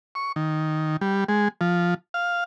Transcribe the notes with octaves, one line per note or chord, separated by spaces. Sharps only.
C#6
D#3
G3
G#3
F3
F5